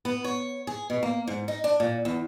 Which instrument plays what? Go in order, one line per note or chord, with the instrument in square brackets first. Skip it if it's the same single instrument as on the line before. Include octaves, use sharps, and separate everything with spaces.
[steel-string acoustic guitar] B3
C#5
G#4
B2
A#3
G#2
D#4
D4
A#2
E2